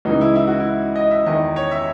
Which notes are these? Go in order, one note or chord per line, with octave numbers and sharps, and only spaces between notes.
C#2 C#3 E3 D#4
E4
E4
F#4
E4
D#5
E5
E2 D#3 D#5
C#5
E5